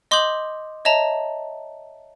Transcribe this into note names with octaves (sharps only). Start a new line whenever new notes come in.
D#5 C6 D6 D#6 G6 F#7
C#5 D#5 E5 A5 A#5